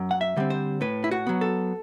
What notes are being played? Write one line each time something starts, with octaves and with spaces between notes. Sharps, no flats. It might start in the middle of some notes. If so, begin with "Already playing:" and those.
Already playing: F#2
F#5
E5
D3 G3 C4
C5
A2 B4
E4
F#4
F#3 B3
A4